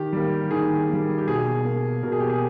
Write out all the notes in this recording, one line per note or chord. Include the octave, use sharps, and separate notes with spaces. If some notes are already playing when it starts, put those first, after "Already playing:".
Already playing: D#3 G4
G3 A#3
D#3 G#4
G3 A#3
G4
B2 G#4
A#3
B2 A#4
G#4
G4
G#4